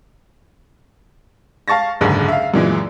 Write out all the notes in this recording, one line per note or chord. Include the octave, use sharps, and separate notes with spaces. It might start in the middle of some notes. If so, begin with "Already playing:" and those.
F5 A5 C#6 A6 A#6
F#1 D#2 G#2 D3
E5 F5
F#2 A#2 E3 G#3